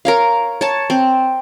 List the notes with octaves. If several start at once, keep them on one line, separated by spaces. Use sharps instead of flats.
A#4 C#5 F5
C#5 A5
C4